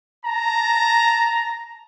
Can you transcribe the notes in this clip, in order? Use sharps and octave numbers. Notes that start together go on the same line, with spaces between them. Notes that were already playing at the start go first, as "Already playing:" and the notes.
A5 A#5